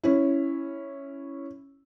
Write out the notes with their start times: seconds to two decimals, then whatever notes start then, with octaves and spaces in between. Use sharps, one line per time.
0.04 C#4 E4